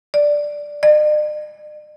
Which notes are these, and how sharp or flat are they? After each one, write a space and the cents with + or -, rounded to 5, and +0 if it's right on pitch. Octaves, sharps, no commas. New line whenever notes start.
D5 +0
D5 +45